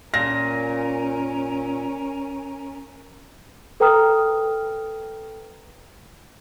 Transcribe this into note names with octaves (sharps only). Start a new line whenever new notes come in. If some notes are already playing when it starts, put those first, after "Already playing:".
A#2 C#4 A#4 A#6
A4 B4 G5 A#5 D#6 F6